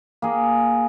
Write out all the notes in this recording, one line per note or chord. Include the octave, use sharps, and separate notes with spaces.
A#3 G#4